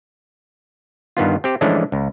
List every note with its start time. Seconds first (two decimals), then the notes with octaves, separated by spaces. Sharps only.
1.17 G2 D#3 B3 F4
1.44 C4 G4
1.61 E3 F3 G#3 A3 C#4 D4
1.92 C#2